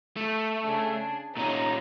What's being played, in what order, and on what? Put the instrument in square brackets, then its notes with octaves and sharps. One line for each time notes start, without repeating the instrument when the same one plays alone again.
[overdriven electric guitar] A3
[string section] C#3 D4 G#4
[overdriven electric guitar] A#2 C#4 [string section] D#4